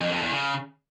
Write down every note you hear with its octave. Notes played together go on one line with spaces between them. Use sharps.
F2
F2
E2
C#3